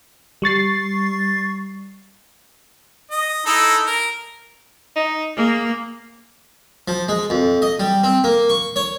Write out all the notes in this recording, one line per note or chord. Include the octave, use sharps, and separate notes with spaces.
G3 C#6 A6 C7
D#5
D#4 E4 A4
A#4
D#4
A#3 G#4
F3
G#3
F2
D#5
G3
C4
A#3
C#6
C#5